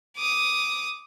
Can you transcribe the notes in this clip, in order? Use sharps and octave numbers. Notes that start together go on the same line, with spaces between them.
D6 D#6